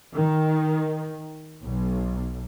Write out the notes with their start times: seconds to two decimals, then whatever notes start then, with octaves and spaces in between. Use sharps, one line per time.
0.15 D#3
1.65 B1